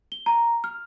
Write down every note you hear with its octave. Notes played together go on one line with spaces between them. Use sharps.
G7
A#5
F6